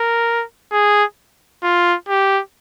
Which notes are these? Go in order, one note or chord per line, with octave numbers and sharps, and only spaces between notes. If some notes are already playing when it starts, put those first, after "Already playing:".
Already playing: A#4
G#4
F4
G4